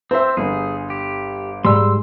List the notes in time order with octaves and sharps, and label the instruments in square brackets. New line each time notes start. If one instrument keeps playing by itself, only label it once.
[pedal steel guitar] C4 [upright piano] C5 E5
[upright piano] G1 [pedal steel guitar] G#4
[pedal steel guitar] G4
[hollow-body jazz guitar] G#2 G3 [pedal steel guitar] C6 E6